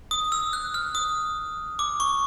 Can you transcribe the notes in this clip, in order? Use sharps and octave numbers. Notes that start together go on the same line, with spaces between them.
D#6
E6
F#6
F6
D#6
D6
C#6